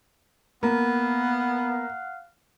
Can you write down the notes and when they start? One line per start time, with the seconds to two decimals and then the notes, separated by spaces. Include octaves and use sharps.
0.63 A#3 B3 F5 F#5